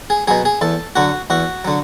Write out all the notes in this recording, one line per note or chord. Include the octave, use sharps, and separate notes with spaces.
G#4
B2 F#3 G#4
G#4
E2 A4
D3 F#3 F#4
E2 F#4
D3 F#3